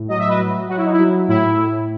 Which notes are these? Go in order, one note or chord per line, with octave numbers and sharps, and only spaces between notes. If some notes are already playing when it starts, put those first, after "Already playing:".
Already playing: A2
F#3 D#5
E5
B4 D#5
F#3
F#3 F#4
E4
D#4
E4
F#3
A2 E4
A2